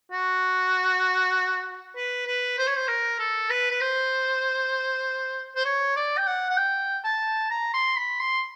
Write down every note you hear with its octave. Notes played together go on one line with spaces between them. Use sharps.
F#4
B4
B4
C5
C#5
C5
A#4
A4
B4
B4
C5
C5
C#5
D5
G5
F#5
F#5
G5
A5
A#5
C6
B5
C6